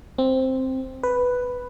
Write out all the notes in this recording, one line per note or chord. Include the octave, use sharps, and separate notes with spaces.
C4
B4